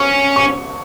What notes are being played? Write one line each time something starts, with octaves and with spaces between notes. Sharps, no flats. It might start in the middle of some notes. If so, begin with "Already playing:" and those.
Already playing: C#4 C#6
C#6